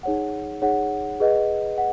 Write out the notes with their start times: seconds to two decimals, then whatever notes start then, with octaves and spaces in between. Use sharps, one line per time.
0.03 D#4 G#4 C#5 F#5
0.62 D#4 G#4 C#5 F#5
1.20 G#4 B4 D#5 F#5
1.78 F#5